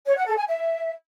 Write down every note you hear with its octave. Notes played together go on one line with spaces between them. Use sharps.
C#5
F#5
A4
G#5
E5